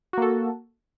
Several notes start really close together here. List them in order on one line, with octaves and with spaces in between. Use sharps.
F#4 A#3 A4